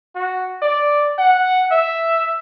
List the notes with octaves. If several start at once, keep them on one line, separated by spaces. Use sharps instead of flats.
F#4
D5
F#5
E5